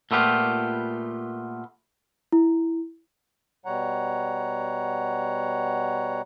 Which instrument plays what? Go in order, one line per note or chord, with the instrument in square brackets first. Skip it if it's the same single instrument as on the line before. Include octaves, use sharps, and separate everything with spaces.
[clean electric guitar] A#2 A3 B3 F4 G4
[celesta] E4
[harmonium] B2 G3 C#5 F#5 A#5